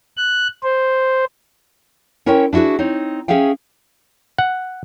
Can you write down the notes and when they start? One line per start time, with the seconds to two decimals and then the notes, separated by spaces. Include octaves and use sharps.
0.17 F#6
0.63 C5
2.26 C#4 E4 A#4 C5 C#5 G5
2.53 D4 E4 F#4 G#4 B4
2.79 C4 D#4 C#5
3.28 C#4 G#4 E5 F5 G5
4.38 F#5